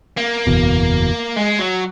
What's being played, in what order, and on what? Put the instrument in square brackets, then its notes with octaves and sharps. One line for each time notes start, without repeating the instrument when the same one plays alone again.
[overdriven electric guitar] A#3
[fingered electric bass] F#1 E2 B2
[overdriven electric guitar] G#3
F#3